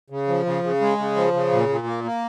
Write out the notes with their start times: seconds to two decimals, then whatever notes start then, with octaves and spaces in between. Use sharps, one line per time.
0.10 C#3
0.28 F3
0.46 C#3
0.64 C#3
0.81 G#3
0.98 C#3
1.16 F3
1.33 C#3
1.51 A#2
1.69 A#2
1.86 A#3
2.04 A#3